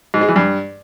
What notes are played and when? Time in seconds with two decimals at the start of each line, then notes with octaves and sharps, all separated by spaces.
0.14 G#2
0.21 G#3
0.29 E3
0.36 G2